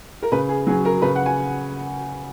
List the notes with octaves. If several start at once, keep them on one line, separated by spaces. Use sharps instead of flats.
A#4
C#3 B4
G#4
F#3 C#4 G#4
A#4
C#3 B4
F#5
G#5